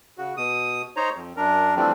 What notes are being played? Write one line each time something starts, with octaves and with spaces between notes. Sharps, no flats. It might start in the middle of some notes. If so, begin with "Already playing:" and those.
C#3 F#4
B2 D#6
D#4 C5 C#5 A#5
F2
F#2 D4 A#4
E3 F3 G3 A3 C4 D4